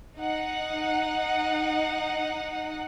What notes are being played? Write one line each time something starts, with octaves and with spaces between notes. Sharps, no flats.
D#4 F#5